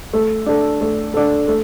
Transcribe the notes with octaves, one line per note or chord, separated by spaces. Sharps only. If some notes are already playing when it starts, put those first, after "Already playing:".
A3
D4 A4
A3
D4 A4
A3